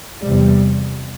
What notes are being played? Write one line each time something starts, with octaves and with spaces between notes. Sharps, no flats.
E2 C3 G3